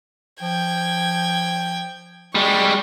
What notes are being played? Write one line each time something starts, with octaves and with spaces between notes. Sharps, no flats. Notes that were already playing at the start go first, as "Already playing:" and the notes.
F3 G5 G#6
G3 G#3 C#6